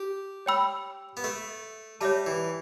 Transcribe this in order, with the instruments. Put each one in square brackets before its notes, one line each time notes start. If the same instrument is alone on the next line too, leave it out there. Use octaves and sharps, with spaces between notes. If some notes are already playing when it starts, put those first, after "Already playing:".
Already playing: [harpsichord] G4
[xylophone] C#5 G5 B5 E6
[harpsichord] B3
A3
[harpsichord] G3 [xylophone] C#5 E5 A5
[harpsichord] E3